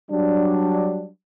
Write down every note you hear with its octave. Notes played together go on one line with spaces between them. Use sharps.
F#3 G3 D4